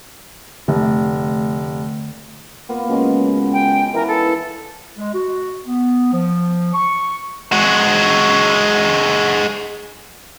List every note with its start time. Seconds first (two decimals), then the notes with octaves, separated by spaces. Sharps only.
0.68 F1 D3 A3
2.69 A#3 B3 F4
2.89 C#2 F#3 G#3 C#4
3.53 G5
3.94 E3 D#4 A#4 G#5
4.07 A4
4.97 G#3
5.14 F#4
5.66 B3
6.12 F3
6.74 C#6
7.52 G#3 F#4